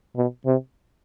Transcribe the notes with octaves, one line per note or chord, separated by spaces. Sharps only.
B2
C3